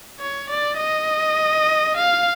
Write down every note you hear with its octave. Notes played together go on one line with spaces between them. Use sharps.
C#5
D5
D#5
F5